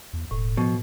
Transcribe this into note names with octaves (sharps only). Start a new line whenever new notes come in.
E2
E1 A2
B2 F3